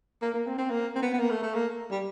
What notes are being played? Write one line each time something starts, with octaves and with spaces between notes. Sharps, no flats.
A#3
A#3
C4
C4
A#3
C4
B3
B3
A#3
A3
A3
A#3
G3